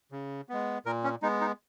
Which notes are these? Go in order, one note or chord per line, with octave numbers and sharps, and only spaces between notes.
C#3
G#3 B3
A#2 A#4
C#4
G#3 B3 D#4
D#4